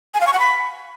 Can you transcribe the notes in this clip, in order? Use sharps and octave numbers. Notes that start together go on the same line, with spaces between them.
G#5
F5
C#6
F#5
B5